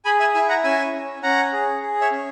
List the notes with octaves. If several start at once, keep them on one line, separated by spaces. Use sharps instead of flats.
G#4 G#5 B5
E5 G#5
E4 E5 G#5
F#5 A#5
C#4 E5 G#5
C#4
C#4 F#5 A#5
G#4
G#4
C#5 E5
C#4